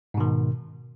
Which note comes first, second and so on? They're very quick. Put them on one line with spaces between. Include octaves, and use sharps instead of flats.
G#2 B2 D#3